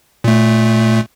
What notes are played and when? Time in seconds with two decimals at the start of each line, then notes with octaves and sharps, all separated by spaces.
0.24 A#2 A3